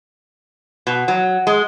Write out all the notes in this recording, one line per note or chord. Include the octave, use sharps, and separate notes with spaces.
B2
F#3
G#3